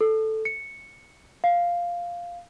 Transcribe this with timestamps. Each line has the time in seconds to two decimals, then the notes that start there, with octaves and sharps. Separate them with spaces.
0.01 A4
0.45 C#7
1.44 F5